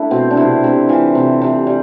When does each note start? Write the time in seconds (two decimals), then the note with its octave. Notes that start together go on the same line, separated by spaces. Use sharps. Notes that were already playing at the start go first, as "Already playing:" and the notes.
Already playing: A3 D4 E4
0.11 B2 C4
0.31 D4
0.37 C3 E4
0.64 C3
0.89 E3 F4
1.15 C3
1.41 C3
1.67 G3